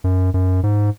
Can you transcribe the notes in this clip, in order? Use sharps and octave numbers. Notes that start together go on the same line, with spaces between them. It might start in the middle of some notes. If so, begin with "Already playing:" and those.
F#2
F#2
G#2